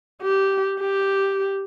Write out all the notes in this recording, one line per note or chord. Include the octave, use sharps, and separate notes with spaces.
G4
G4